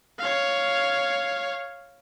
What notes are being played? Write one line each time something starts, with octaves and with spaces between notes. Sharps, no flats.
C#5 F5